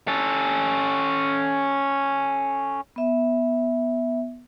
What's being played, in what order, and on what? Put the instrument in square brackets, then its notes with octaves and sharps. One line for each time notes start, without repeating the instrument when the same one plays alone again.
[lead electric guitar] C#4 A4
[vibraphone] B3 E5